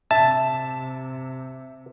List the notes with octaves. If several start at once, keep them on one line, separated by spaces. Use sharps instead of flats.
C3 E5 A5